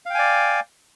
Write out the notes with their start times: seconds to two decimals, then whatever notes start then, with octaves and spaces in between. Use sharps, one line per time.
0.06 F5
0.10 G5
0.14 G#5
0.19 D5